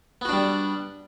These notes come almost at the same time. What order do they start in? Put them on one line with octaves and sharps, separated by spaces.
B3 F#4 D4 G3